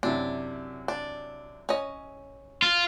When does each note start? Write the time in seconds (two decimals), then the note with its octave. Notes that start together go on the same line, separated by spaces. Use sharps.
0.03 F#2 C3 D4 E4
0.88 D4
1.69 C#4 D#5
2.62 F4